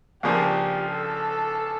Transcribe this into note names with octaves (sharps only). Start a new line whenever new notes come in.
C#2 C#3 F3 A#3 D4 G4
A4